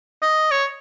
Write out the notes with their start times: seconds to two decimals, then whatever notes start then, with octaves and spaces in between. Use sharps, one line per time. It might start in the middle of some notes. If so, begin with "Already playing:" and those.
0.22 D#5
0.52 C#5